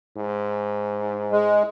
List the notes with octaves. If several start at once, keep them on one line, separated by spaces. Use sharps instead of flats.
G#2
G#3